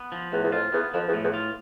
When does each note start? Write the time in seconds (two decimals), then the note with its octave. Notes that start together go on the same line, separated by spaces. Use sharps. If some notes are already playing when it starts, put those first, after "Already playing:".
Already playing: B3
0.12 F3
0.32 E2 A2
0.43 E2
0.52 F2 F4
0.72 E2 B3
0.93 F2 F3
1.08 E2
1.13 A2
1.23 E2
1.33 F4